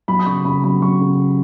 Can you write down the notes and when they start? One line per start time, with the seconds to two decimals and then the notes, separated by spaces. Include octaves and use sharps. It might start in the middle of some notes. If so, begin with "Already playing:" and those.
0.08 F#3 B5
0.19 D#6
0.26 C#3 C#6
0.45 C#3 B5
0.64 F#3 B5
0.82 F#3 C#6
1.01 C#3